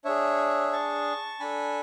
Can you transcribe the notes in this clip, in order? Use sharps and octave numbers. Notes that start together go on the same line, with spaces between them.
D4 G#4 C#5 E5
A5 C#6
D4 A4 G#5 B5